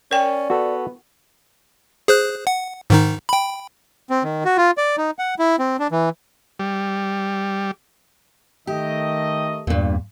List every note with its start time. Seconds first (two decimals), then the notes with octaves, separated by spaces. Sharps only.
0.11 C#4 A#4 D5 G5
0.50 B3 F#4 A4
2.08 G#4 C5 F#6
2.47 F#5
2.90 G#2 D#3 D#4
3.29 G5 B5
4.10 C4
4.24 D#3
4.45 F#4
4.58 F4
4.78 D5
4.98 D#4
5.19 F#5
5.39 E4
5.59 C4
5.79 D4
5.92 E3
6.59 G3
8.67 D#3 A3 G4 D#5
9.67 E2 G2 A#2